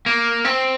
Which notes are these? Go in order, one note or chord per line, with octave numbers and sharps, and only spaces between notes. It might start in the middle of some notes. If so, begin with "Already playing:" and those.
A#3
C4